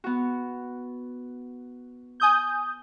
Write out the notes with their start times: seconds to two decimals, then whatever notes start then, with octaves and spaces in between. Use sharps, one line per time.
0.04 B3 F#4
2.20 G#5 D#6 G6